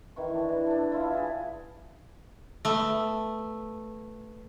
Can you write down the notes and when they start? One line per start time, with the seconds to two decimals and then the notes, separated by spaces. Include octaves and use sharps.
0.16 D#3 E3 C#6
0.34 D4
0.49 E3
0.66 D4 A4
0.92 E4 F4 E5
1.12 D4 G4 G#4
2.65 A3 B3